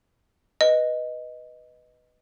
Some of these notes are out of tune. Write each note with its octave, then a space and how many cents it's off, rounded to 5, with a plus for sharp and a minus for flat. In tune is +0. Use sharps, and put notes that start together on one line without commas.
B4 +0 D#5 +0